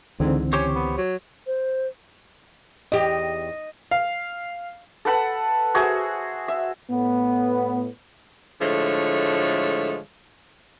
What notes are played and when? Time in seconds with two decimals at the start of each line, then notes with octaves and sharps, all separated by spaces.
0.20 C#2 G#2 D3 E3 C4
0.53 C#4 G4 C5 C#5
0.75 B3
0.98 F#3
1.47 C5
2.92 E2 G4 D#5
3.91 F5
5.05 A4 B4 F#5 B5
5.74 F#4 G#4 C5 E5
6.48 E5
6.91 A2 B3
8.61 A2 D3 F3 G#3 A3 C#5